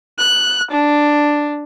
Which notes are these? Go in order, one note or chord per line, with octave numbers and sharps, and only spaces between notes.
F#6
D4